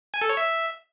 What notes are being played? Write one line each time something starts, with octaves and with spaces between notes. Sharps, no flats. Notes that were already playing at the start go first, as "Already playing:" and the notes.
G#5
A4
C#5
E5